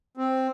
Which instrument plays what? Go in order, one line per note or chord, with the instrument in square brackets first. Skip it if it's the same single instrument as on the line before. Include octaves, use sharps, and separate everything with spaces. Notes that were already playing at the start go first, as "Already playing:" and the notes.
[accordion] C4